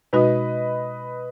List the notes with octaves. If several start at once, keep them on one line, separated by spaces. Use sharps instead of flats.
B2 G#3 D#4 F#4 B4 D#5